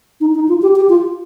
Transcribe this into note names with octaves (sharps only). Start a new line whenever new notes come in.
D#4
D#4
F4
G4
G4
F4